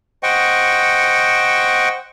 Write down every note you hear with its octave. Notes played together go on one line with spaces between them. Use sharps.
C5 D#5 F#5 G5 C#6